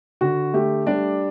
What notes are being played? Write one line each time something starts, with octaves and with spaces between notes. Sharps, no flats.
D3 F#4
A3 G4
G3 D4 D5